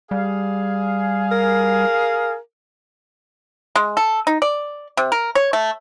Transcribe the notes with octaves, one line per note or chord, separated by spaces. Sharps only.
G3 G#4 F5
A#4
G#3
A4
D#4
D5
C3
A#4
C#5
A3